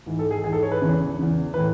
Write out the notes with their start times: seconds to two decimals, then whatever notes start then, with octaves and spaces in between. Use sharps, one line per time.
0.06 G#2 E3
0.19 A4
0.31 G#4
0.44 G#2 E3 G#4
0.53 A4
0.63 C#5
0.72 B4
0.81 E2 C#3 E3
1.17 E2 C#3 E3
1.54 A2 E3 B4